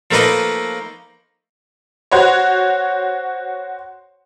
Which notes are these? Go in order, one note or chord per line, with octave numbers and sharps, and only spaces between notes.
F3 A3 A#3 D#4 B4 D#5
F#4 C5 C#5